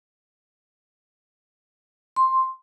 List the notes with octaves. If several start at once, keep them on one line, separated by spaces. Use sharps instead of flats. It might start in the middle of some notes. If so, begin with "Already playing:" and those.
C6